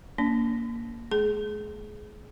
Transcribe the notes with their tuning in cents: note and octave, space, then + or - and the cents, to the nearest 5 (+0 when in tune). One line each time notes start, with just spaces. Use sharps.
A#3 +0 D4 -45
G#3 +30 G#4 +20